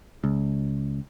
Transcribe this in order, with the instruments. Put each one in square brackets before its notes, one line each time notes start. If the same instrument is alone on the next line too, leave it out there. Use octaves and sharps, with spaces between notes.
[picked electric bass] C#2